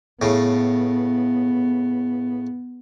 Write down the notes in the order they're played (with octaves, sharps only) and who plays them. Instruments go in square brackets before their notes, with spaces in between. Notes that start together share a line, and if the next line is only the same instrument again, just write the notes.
[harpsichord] A2 C#3 [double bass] B3